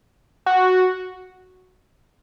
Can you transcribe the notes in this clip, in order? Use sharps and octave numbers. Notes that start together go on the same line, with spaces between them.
F#4